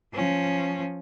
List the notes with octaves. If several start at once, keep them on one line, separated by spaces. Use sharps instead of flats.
F3 C#4